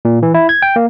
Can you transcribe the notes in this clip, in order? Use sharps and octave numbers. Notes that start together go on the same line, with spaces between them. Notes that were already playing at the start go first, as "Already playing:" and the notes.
A#2
E3
E4
G#6
G5
A#3